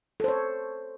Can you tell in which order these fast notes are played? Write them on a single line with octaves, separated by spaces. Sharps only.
A4 C5 C#5